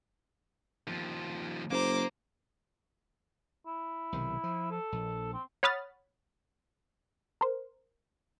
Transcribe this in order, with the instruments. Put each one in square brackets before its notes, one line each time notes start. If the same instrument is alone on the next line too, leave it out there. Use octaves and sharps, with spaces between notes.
[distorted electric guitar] D#2 F3
[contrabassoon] F#1 [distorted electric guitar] A#3 A#5 [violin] C5 D6
[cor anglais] E4
[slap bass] B1 C3 D#3
F3
[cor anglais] A4
[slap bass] A#1
[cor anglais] C4
[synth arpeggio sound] C#5 F#5 B5 D#6 F6 A6
A#4 C5